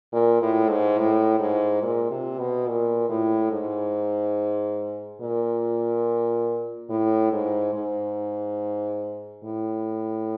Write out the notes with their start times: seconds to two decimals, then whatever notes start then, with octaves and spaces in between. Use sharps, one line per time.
0.12 A#2
0.42 A2
0.69 G#2
0.98 A2
1.39 G#2
1.82 A#2
2.11 C3
2.39 B2
2.68 A#2
3.09 A2
3.52 G#2
5.21 A#2
6.90 A2
7.33 G#2
7.75 G#2
9.44 A2